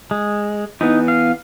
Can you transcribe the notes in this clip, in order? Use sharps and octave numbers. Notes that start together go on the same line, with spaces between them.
G#3
E3 B3 D#4
F5